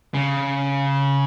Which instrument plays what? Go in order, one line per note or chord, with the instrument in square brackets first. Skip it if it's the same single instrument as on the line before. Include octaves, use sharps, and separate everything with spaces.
[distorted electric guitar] C#3